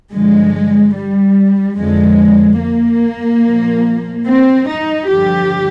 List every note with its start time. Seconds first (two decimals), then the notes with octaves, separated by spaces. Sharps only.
0.12 G2 D3 F3 G#3
0.95 G3
1.77 F2 D3 F3 G#3
2.61 A#3
3.43 A#2 F3
4.26 C4
4.67 D#4
5.08 G2 D3 F3 G4